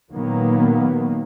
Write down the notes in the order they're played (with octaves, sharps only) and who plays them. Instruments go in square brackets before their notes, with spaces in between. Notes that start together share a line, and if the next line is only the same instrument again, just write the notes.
[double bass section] A#2 D#3 F#3 A#3 B3